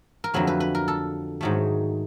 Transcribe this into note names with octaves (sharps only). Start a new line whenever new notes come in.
A#4
F2 D3 F#3 A3 B4
B4
B4
A#4
A4
G#2 D#3 F#3 A3